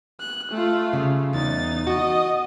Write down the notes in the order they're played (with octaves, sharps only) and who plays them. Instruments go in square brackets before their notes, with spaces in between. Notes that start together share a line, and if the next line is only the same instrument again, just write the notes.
[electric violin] F#6
A3 F4
[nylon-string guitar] C#3 G3
[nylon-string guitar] E2 [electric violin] D#4 A6
[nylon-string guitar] F#4 [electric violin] D#5